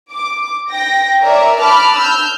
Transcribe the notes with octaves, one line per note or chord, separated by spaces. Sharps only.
D6
G5 A#6
A#4 C#5 D5 E5
A5 B5 D6 F6 F#6
E6 F6 G6